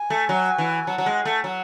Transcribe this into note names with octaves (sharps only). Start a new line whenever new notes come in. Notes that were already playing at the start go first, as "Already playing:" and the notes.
Already playing: G#5
A3
F#3
E3
F#3 A5
F#3
G#3
G#5
A3
F#3